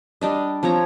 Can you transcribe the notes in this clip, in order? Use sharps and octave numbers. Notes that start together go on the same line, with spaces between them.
G3 D4 D#5
F3 C4 C#5 A#5